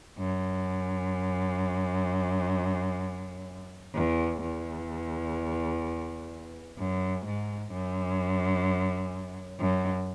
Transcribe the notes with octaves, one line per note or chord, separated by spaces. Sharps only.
F#2
E2
E2
F#2
G#2
F#2
F#2